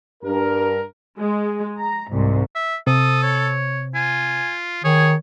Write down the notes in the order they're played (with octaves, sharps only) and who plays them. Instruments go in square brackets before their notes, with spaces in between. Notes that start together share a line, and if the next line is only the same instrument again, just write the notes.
[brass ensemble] G2 A#4
[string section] G#3
A#5
C2 G#2
[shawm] E5
[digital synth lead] C3 [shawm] A4 [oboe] D#6
[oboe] C#5
[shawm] F4 [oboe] G#5
[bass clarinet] D#3 [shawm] G#4 [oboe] C#5